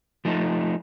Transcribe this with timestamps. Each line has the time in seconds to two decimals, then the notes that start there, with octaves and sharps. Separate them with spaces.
0.25 F3 A3 D#4